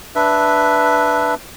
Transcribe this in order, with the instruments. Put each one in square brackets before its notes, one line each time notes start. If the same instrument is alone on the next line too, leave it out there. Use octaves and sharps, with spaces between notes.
[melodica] D4 B4 E5